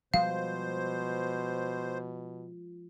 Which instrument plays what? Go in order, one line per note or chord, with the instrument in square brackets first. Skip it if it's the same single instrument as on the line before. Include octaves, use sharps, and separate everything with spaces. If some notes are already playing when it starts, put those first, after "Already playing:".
[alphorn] B2 [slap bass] F3 G3 G#3 [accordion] C5 [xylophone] F5